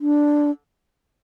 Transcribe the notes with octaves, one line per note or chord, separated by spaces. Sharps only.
D4